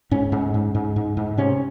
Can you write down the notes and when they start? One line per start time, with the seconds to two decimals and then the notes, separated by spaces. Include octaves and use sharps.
0.11 G#2 C#4
0.32 G#2
0.54 G#2
0.75 G#2
0.96 G#2
1.17 G#2
1.37 C3 C#4